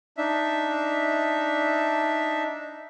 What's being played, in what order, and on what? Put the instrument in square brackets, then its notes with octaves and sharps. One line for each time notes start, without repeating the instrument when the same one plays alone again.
[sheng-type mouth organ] D4 D#4 E5